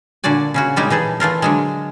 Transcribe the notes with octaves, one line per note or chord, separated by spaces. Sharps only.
A#2 D3 F#4 D5 G#5
C#3 C#4 F#4
A#2 G3 G#3 D#4
E3 D#4 G#4 A4
E3 A3 F4 A#4
D3 F#3 G#3